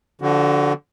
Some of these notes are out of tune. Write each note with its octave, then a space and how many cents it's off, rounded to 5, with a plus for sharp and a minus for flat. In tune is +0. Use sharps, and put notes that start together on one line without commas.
D3 -10 F3 +0 F#4 +25